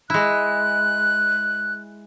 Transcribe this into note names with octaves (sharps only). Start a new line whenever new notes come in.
G#3 E4 F#6